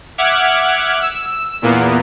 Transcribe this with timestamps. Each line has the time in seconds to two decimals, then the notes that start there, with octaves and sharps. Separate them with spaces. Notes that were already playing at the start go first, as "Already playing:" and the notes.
0.18 E5 F#5 D6 F6 F#6 G#6
1.02 E6
1.62 E2 A#2 A#3 B3